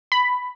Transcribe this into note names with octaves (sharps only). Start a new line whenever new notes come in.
B5